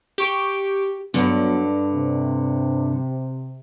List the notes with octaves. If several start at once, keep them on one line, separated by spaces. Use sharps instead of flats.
G4 C#6 D7
G2 D3 F#3 B3
C3